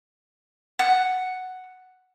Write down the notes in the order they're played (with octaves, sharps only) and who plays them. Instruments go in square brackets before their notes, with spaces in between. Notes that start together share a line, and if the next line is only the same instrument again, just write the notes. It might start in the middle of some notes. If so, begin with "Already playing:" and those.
[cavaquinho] F#5